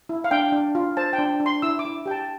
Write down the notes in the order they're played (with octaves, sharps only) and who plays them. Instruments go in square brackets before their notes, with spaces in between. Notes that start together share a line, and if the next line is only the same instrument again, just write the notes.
[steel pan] E4
F5
D4 G5
D4
F4
C5 A5
G5
D4
D4
C6
E4 E6
D6
E4
G4 G5
A5